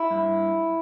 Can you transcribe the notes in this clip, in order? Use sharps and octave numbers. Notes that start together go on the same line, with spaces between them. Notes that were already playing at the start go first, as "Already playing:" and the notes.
Already playing: E4
G2